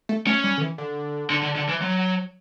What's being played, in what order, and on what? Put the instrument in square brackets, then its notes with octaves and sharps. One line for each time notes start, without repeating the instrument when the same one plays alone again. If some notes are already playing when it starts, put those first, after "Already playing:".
[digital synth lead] A3
[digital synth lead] A3 [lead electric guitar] C#4
[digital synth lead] G3
D3
E3
D3
[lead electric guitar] D3
D3
D3
E3
F#3